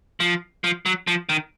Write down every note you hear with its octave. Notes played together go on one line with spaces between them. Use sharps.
F3
F3
F#3
F3
D#3